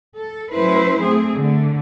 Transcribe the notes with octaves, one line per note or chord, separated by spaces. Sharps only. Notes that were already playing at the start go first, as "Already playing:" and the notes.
A4
F#3 A3 C#4 E4 B4 C5
A3 C4 G#4
D3 A3